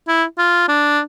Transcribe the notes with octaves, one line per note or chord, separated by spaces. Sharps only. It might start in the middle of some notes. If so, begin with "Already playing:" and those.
E4
F4
D4